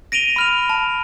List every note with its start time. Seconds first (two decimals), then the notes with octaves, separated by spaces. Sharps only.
0.12 A#6 D7 D#7 F7 G7
0.36 B5 F6 F7
0.70 A5